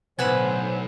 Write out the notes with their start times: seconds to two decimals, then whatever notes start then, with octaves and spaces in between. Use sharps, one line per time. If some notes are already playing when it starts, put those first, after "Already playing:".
0.19 B1 A2 D3 B4 C5 F#5 G#5